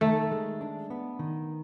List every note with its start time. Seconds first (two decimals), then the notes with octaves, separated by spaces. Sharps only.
0.01 D#3 A3
0.32 G#3
0.61 D4
0.90 B3
1.19 D#3